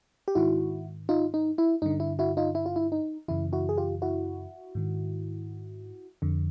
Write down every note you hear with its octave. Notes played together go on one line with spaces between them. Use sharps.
G4
G#2 D#3 E4 F#4
D#4 F4
D#4
E4
G2 D3 D#4
E4
E4 F#4
D#4 F4
E4
F4
E4
D#4
F#2 C#3 E3 E4
E4 F#4
G#4
F4 G4
E4 F#4
G#2 D#3
F2 D3